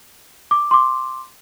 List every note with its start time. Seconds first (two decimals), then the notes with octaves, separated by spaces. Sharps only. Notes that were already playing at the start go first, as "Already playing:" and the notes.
0.51 D6
0.71 C6 D6